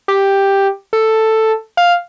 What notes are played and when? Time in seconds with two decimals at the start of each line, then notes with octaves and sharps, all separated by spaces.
0.08 G4
0.93 A4
1.77 F5